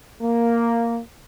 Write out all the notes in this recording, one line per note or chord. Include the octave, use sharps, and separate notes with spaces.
A#3